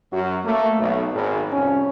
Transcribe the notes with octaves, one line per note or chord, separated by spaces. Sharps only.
F#2 F#4
A3 A#3
B1
G#1
C2 F2 C#4